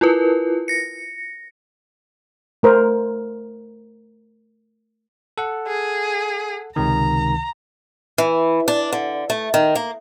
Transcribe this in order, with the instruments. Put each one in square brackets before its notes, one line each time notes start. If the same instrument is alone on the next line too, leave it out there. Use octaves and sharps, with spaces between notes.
[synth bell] E4 F4 A#4 B4
A#6 C#7
[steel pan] A3 A#4 C5
[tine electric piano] A4 F#5
[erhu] G#4
[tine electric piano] C#2 C3 D#3 [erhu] A#5
[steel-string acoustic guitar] E3
D4
D3
A3
D#3
A#3